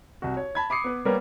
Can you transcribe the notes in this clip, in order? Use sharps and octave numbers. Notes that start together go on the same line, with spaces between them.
C2 F#4
C#5
A5 B5 G#6
B5 D6 D#6 C7 C#7
B3 B4
G3 A#3 B3 A#4 B4 C#5